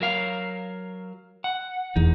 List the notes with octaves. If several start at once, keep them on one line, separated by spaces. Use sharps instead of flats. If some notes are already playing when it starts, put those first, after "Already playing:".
F#3 A#4 F5
F#5
F1 E2 D#4